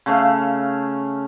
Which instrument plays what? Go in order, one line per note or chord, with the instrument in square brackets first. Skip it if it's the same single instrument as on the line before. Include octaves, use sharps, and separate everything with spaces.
[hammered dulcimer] C#3 A3 F5